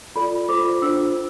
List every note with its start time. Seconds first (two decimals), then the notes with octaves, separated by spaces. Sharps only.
0.15 F4 A4 D5 B5
0.49 F4 A4 C5 D6
0.82 D4 F4 C5 E6